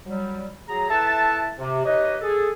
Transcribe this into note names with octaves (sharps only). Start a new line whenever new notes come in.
F#3 G3
F#3 G#4 A#5
E4 A4 B4 E5 A5
C3
D#4 G4 B4 C#5 D#5
G#4 A4